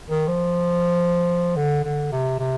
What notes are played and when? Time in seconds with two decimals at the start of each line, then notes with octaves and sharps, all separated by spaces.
0.10 D#3
0.28 F3
1.56 D3
1.84 D3
2.12 C3
2.38 C3